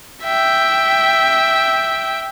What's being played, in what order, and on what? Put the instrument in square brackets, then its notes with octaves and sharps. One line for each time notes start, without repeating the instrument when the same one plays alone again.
[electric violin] E5 G5